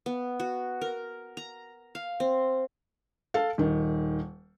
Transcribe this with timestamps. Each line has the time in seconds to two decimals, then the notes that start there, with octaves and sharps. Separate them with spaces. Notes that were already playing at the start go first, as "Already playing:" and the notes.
0.06 B3
0.40 F#4
0.81 A#4
1.37 A#5
1.95 F5
2.20 C4
3.34 A4 F5
3.58 D#1 D#3